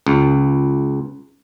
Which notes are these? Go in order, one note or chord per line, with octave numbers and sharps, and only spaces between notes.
C#2